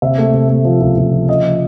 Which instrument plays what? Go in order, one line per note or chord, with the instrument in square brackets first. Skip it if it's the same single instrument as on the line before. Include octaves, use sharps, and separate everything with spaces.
[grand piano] C3 E5
A3
C3
A3
F3
C#2
C#2
F3
C#3 D#5
F3